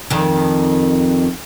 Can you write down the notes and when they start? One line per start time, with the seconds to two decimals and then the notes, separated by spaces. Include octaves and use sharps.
0.10 F2 D#3